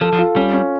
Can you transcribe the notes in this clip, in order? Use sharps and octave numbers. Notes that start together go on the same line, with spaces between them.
F3 A4
F3
F4
G3 C#4
C#4